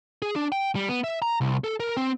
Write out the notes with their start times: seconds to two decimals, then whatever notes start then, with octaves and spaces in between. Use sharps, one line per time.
0.22 G#4
0.36 D4
0.52 G5
0.75 G3
0.89 B3
1.04 E5
1.22 A#5
1.41 C2
1.64 A4
1.80 A#4
1.97 C4